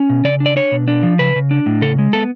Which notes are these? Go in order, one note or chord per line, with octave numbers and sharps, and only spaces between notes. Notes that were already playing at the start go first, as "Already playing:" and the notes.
Already playing: C#4
B2
C#3 D5
D4
D5
D4 C#5
B2
D4
F3
C#3 B4
C#3
D4
A2
C#3 A4
G#3
B3 A4